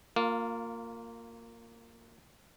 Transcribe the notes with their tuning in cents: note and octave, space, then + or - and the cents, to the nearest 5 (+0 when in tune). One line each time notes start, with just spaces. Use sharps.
A#3 -15 F4 +15